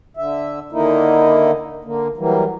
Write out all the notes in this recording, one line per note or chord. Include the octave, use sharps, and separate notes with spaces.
D3 E5
D3 D#3 A#3 D#4 E4
D3 A#3
E3 F#3 G3 A#3